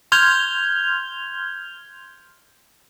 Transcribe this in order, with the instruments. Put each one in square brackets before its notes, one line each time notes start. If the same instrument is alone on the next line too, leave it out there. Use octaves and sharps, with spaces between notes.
[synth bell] C6 F6 G6 G#6 F7 G7